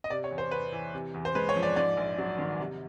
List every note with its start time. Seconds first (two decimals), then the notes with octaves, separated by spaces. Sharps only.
0.04 D#5
0.10 C3 D5
0.24 C#5
0.31 E2
0.38 C5
0.51 E2 B4
0.73 E3
0.94 C3
1.14 E2
1.25 C5
1.35 G#3 B4
1.49 C#5
1.56 F3
1.63 D5
1.76 G#2 D5
1.97 A#1
2.18 F#3
2.38 D#3
2.60 C3